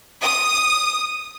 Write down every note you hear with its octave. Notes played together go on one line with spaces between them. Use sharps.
D#6